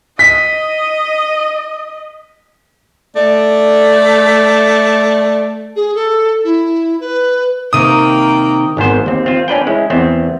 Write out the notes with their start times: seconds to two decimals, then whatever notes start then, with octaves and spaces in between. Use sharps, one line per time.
0.19 D#5 B6
3.16 A3 D5
5.76 G#4
5.95 A4
6.44 E4
7.00 B4
7.73 C3 D#3 A#3 G5 D#6 D#7
8.77 G#1 G#2 B3 C5
9.06 D#2 C4
9.26 C4 F4
9.48 C#4 D4 B4 G5
9.67 G#3 C#4 E4
9.90 E2 B3 C4